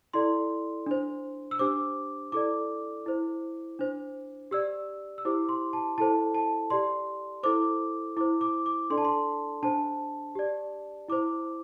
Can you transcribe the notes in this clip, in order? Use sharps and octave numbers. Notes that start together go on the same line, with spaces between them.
E4 A4 D5 C6
D4 C5
E6
D4 G4 C5 D6
E4 A4 D5 D6
E4 C5
D4 C5
G4 D5 E6
E6
E4 G4 C5 D6
C6
A5
E4 A4 C5 A5
A5
G4 D5 C6
E4 A4 C5 D6
E4 C5 D6
D6
D6
D4 A4 D5 C6
A5
C6
D4 C5 A5
G4 D5
E4 C5 D6